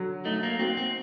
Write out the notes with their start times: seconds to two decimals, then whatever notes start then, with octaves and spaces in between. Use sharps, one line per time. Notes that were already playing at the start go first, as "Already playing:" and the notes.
Already playing: D3 F#3
0.25 A3 D#4
0.43 A#3
0.59 C4 F#4
0.77 C4